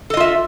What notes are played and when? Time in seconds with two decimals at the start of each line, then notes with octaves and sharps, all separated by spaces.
0.10 A4
0.14 D#5
0.17 F4
0.20 E5